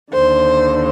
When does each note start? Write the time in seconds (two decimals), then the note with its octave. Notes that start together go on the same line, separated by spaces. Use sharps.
0.12 D#2 D3 C5